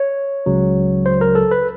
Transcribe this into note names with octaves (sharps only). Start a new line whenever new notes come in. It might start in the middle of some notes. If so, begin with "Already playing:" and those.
Already playing: C#5
C#2 C#3 F#3
C5
A#4
A4
B4